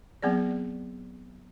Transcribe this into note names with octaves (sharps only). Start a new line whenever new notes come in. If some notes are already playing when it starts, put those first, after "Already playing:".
F#3 B3 C4 G#4 D5